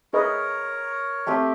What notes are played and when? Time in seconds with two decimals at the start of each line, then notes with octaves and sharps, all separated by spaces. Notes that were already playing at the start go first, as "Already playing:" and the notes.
0.13 G#4 A#4 B4 C#5 D#5
1.27 A3 C4 G4 G5